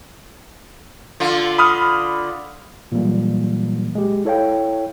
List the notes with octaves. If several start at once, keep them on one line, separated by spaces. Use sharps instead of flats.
D3 F4
B5 D#6 F6
A#2 E3 F#3 G3 A#3
G#3 G4
E4 A4 C#5 F5 G5